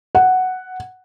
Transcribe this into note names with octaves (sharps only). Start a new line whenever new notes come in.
F#5